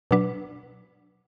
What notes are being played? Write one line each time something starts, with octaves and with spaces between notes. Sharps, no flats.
B2 F#3 D4 B4